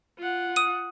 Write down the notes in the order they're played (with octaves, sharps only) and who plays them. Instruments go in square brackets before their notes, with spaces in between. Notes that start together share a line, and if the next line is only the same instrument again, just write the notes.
[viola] F4 F#5
[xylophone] D#6 D#7